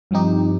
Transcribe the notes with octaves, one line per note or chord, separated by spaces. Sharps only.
G2 F3 C4 D#4 G4